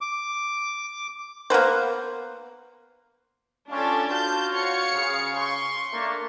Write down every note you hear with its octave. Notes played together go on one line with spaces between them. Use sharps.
D6
A#3 B3 B4 C5
G3 C#4 D4 F4 A4
F4 F#4 A5 G6
C#5 F5 C#7
C#3
C6 C#6
A3 A#3 D4